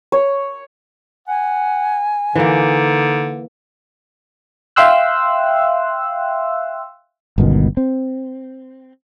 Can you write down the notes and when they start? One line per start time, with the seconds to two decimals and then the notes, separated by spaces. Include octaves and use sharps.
0.12 C#5
1.28 F#5 G#5
2.36 D3 E3 A#3 D#4
4.76 E5 F5 G5 C6 E6 F#6
7.38 G1 C#2 B2 D#3
7.77 C4